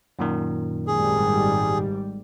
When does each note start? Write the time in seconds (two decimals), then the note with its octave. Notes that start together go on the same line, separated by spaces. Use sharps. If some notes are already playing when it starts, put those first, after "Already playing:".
0.19 F#2 A#2 D#3
0.87 G#1 G#2 G3 G#4